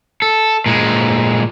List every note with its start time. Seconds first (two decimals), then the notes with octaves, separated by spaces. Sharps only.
0.22 A4
0.66 A#2 G#3